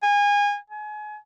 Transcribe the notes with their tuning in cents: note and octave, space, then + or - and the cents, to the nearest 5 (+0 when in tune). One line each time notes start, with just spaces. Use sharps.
G#5 -25
G#5 +30